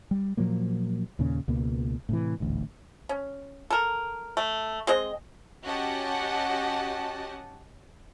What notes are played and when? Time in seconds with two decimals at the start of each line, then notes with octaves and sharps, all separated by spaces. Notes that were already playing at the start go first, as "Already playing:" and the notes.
0.11 G3
0.37 A#2 F3 F#3 A#3
1.19 D#2 A#2 C#3
1.48 C#2 B2 A#3
2.09 A2 C3 E3
2.40 D#1 A1 D2
3.09 C#4
3.70 A4 A#4
4.37 A3
4.87 G#3 C4 D#5
5.66 C#4 F#4 G4 D#5 F#5 A5